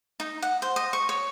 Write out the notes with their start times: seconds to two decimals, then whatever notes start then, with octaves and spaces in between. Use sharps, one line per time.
0.20 D#4
0.42 F#5
0.62 C5
0.76 D#5
0.93 C#6
1.09 C#5